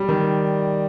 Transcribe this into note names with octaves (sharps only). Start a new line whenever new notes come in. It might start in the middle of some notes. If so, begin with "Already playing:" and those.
Already playing: G3
D#3